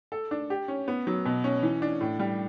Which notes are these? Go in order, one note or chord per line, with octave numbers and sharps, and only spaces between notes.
A4
D4
G4
C#4
B3
F#3
B2
C#4
E3
D4
A2
G3